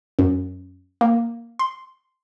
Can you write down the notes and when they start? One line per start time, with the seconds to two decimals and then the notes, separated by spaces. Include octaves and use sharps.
0.19 F#2
1.01 A#3
1.59 C6